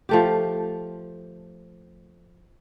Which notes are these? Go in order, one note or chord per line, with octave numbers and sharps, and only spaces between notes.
F3 A3 G4